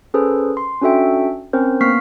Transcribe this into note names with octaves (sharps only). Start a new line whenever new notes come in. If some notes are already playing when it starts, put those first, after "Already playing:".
C#4 G#4 A4 B4 C5
C6
C#4 D4 F#4 A4 E5 G5
C4 C#4 A#4 C5
A#3 B3 C#6 F6 B6 C7